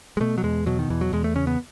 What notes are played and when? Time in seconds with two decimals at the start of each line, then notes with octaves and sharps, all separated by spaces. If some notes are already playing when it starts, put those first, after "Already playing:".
0.17 G#3
0.20 B2 A3
0.38 F#3
0.43 E2 G#3
0.66 B2 F#3
0.79 D#3
0.90 E2 E3
1.01 F#3
1.13 E2 G#3
1.24 A3
1.36 C#3 C#4
1.47 B3